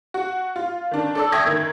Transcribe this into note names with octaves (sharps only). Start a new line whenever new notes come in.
F#4
F4
D#3 D4
A4 D5 E6
E5 G5 C#6 D#6 G#6 A#6
F#2 D#3